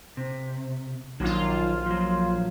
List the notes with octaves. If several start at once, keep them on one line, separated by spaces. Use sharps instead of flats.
C3
A#1 D#3 F#3 F4
F3 F#3